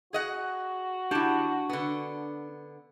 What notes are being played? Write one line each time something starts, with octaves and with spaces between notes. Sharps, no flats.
F#4 G#4 D#5 F#5
D4 E4 G4 F#5 A5
D3 B3